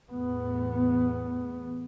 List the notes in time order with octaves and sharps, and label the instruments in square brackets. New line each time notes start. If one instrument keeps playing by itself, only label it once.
[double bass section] E2 A2 B3